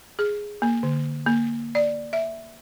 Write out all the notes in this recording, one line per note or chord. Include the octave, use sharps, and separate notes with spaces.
G#4
A#3
D3
A#3
D5
E5